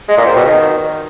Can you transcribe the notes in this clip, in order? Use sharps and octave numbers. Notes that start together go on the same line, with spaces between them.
G#3
A#2
C4
B2
D#3